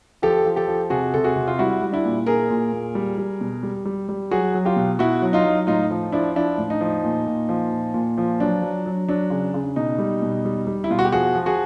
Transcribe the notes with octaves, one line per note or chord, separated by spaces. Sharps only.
F3 G4 A4
F3
G4 A4
F3
C3 F#4 G#4
C3 A4
F#4 G#4
C3
F4
G3 E4 F#4
G3
D4 E4
A#2
A#2 G#4 A#4
A#2
A#2
G3
G3
B2
G3
G3
G3
F#3 F#4 G#4
F#3
F4 G4
B2
B2 E4 F#4
F#3
D#4 F4
F#3
A2 D#4 F4
F3
F3 D4 E4
F3 D4 E4
A2
D#4
F3
A#2
A#2
F3
A#2
A#2
F3
F#3 D4
F#3
F#3
F#3 D4
C#3
C#3
B2 D#4
G3
B2
G3
G3
E4
B2 F4
F#4
G4
F3 F#4 G#4
F3
F#4 G#4